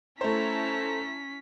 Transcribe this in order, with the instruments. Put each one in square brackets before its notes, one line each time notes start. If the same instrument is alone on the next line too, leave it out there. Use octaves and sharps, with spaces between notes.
[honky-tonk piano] A3 C5 [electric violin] C#4 B6 [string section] E4 A5 A#5